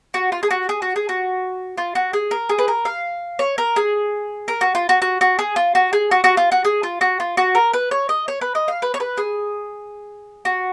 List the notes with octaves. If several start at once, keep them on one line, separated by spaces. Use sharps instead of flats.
F#4
F4
G#4
F#4
G#4
F#4
G#4
F#4
F4
F#4
G#4
A#4
G#4
B4
A#4
F5
C#5
A#4
G#4
A#4
F#4
F4
F#4
F#4
F#4
G#4
F4
F#4
G#4
F#4
F#4
F4
F#4
G#4
F4
F#4
F4
F#4
A#4
B4
C#5
D#5
C#5
B4
D#5
F5
B4
C#5
B4
G#4
F#4